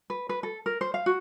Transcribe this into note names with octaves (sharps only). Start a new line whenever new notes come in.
B4
B4
A4
A#4
C5
F5
F#4